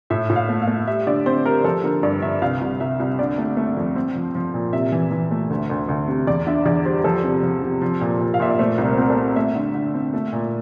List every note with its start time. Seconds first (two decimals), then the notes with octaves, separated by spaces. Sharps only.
0.10 A2 E5
0.30 A2
0.36 F5
0.49 A3
0.62 F5
0.68 A3
0.87 G3 E5
1.07 D3 D5
1.26 C4 C5
1.45 G3 A#4
1.64 F3 A4
1.84 D3 A#4
2.03 G2 D5
2.22 D3 E5
2.42 C2 F5
2.61 C2
2.80 C2 E5
3.00 C2
3.19 D3 D5
3.38 A3
3.57 A3
3.77 F2
3.96 C4
4.15 F3
4.35 F3
4.54 A#2
4.73 C3 E5
4.92 E3
5.11 E3
5.31 A3
5.50 D2
5.70 D2
5.89 D2
6.08 C3
6.27 E2 D5
6.47 D3 E5
6.66 E2 D5
6.85 G3 C5
7.04 F3 A4
7.24 C3
7.43 F3
7.62 C3
7.82 F3
8.01 A#2
8.20 A#2
8.34 F5
8.40 A#2 E5
8.50 D5
8.59 A3 C5
8.78 C2
8.85 A#4
8.93 C5
8.97 C4 A#4
9.10 A4
9.17 C4
9.36 A3 E5
9.55 D3
9.74 D3
9.94 C4
10.14 A3
10.33 A#2